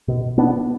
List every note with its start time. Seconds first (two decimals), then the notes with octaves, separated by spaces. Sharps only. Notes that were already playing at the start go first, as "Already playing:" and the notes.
0.08 B2
0.38 B3 D4